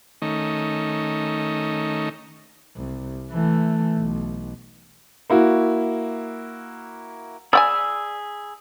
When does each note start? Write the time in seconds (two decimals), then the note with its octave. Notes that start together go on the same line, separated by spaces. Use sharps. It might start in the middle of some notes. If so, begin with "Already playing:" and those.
0.22 D#3 A3 C#4 D#4
2.77 C2
3.31 E3 A3
3.97 B1
5.30 A#3 E4 F#4
7.53 G#4 D5 G5 G#5 B5 E6